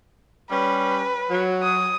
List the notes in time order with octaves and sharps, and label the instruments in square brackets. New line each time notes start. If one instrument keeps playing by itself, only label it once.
[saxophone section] G3 C#4 [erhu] B4
[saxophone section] F#3
[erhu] D#6